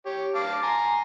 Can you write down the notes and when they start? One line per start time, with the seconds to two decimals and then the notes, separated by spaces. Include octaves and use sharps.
0.06 G4 C#5
0.35 F5 A5 D6
0.63 G#5 A#5 C6